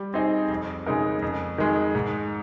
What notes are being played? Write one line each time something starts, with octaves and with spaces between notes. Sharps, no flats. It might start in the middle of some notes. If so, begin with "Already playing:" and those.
Already playing: G3
C4 D#4 G#4 C5
F2
C#3 G#3 D#4 A#4
F2
D#3 G#3
G#2